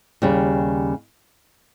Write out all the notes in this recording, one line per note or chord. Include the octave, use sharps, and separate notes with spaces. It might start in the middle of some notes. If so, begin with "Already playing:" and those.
D#2 C#3 G3